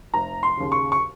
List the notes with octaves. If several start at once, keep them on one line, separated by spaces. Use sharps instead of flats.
F1 A#5
C6
D#2 C#3
C#6
C#6